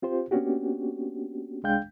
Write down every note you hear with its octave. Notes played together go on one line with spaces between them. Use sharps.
C4 F4 G4 C5
A#3 B3 C#4 D4 F#4 G4
C2 G#3 D4 F5 G5 G6